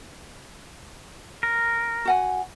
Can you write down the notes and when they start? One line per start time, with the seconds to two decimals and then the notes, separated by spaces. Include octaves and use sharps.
1.43 A#4
2.05 F#4 F#5 G#5